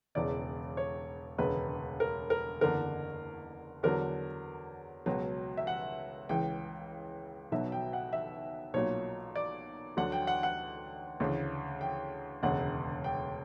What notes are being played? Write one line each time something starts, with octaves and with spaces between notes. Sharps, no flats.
E1 E2 C#3 E3 D5
C#5
E1 D2 C#3 B4
A#4
A#4
F#1 E2 D3 A#4
E2 D3 F#3 A#4
C#2 B2 F#3
E5
F#5
C#2 C#3 E3 G5
B1 B2 F#3 E5
G5
F#5
E5
B1 A#2 F#3 C#5
D5
D2 D3 F#3 F#5
G5
F#5
F#5
D2 C#3 E3
G5
E1 D2 C#3 F#5
G5